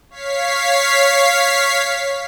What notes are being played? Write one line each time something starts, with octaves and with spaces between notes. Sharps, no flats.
C#5 F5 B6 C7